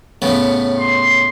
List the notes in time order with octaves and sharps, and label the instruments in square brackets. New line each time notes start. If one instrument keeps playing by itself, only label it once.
[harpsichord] A2 C#3 B3
[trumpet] C6